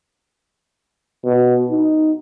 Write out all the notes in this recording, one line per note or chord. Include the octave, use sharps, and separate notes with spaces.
B2
D#4